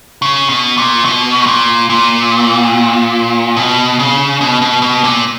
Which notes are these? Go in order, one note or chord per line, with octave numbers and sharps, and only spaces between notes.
C#3
B2
A#2
B2
A#2
A#2
B2
C#3
B2
B2
B2
A#2